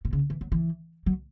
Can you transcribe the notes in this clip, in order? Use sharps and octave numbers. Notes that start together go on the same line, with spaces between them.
B2
C#3
E3
F#3
E3
F#3